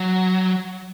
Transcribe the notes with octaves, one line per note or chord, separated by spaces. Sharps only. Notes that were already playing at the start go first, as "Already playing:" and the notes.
Already playing: F#3